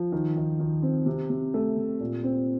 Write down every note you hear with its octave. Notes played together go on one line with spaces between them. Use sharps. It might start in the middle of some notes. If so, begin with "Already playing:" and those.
Already playing: F3
D#3
D#3
D#3
C4
C3
C3
A3
C3
A#2
C4